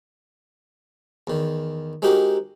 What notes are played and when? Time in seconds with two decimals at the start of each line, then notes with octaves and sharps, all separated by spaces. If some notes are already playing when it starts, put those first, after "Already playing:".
1.27 E2 D#3
2.02 G#3 C4 D#4 F#4 G4 A#4